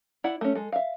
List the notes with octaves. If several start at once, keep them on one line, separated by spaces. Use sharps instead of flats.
E4 D5 F#5 B5
A3 C#4
G#3 A4
E5 F5